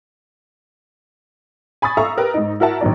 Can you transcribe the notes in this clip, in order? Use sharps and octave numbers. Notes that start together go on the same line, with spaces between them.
G#5 B5 C#6 D#6 A6
A4 E5 F5 A#5 C#6 E6
G4 A#4 B4
G#2 D#4
E4 F#4 A#4 E5 F#5 A5
A#1 D#3 F#3 D5